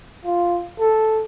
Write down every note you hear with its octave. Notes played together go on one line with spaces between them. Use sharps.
F4
A4